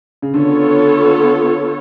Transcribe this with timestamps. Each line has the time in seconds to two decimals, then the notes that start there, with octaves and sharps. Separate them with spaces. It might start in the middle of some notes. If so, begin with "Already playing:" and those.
0.22 C#3
0.34 D3 B3 F4 A4 C#5